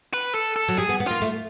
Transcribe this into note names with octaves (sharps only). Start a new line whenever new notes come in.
B4
A4
A4
F#3
G3 G#4
B3
B3
A#3 F4
A3